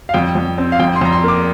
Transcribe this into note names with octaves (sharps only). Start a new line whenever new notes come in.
F5
F2 G5
F2
C4
F5
F2 G5
C6
F2 A#5
C6
A#3 D6